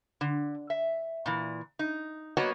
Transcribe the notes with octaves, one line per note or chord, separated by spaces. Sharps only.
D3
E5
A#2 E3
D#4
F#3 A#3 B3 F#4 C#5 D#5